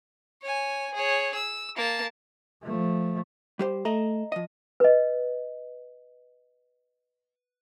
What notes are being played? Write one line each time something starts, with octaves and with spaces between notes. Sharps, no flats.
C#5 G#5
G#4 C#5
E6
A#3 A5
F3 A3
G3 G4 C5
A3 D#5 A#5
F3 D#5
B4 D#5